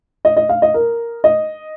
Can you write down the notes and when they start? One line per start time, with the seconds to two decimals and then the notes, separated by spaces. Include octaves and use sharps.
0.25 D#5
0.37 D#5
0.49 F5
0.62 D#5
0.74 A#4
1.24 D#5